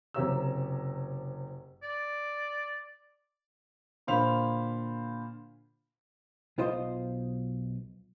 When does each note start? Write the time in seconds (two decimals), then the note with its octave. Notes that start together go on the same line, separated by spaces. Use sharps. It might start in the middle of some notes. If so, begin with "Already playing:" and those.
0.14 F#1 C3 G4 C#5 A#5 E6
1.83 D5
4.07 A#2 D3 C5 F5 B5 F7
6.58 B1 F4 C5 D#5